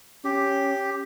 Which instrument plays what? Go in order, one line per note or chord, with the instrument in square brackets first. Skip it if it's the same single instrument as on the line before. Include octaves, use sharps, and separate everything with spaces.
[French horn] C#4 [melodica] G4